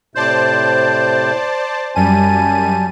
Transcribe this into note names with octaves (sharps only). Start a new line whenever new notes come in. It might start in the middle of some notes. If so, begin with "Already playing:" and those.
A2 C3 C5 D5 A5 G6
F#2 G3 G#5 A5 D#7